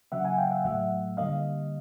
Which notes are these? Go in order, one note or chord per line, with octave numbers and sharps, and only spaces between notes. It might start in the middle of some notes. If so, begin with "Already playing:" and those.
C#3 F#3 A#3 E5 F#5
F#5 G#5
F5 G5
E5 F#5
A2 F#3 A3 E5 F#5
D3 G3 A#3 D#5 F5